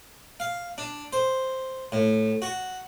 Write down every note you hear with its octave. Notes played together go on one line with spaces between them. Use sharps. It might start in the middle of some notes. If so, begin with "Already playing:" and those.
F5
D4
C5
A2
F#4